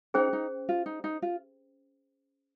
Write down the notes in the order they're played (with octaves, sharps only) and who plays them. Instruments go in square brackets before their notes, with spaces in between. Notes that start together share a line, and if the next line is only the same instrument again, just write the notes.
[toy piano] C#4 G#4 C5 G5 [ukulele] D#4
[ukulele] D#4
F4
D#4
D#4
F4